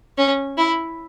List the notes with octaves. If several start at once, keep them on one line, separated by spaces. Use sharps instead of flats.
C#4
E4